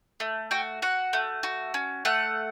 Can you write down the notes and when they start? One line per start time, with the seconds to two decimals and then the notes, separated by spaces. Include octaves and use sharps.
0.20 A3
0.51 F#4 G5
0.82 F#4 F#5
1.13 A3
1.43 F#4
1.74 C#4
2.05 A3 F#5